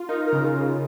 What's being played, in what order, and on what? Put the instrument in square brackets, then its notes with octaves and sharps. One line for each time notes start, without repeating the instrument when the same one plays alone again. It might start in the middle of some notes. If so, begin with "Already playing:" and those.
Already playing: [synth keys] F4
[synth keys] D#4 [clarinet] A#4
[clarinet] A#4
[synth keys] C#3
[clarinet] F4
[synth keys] C#3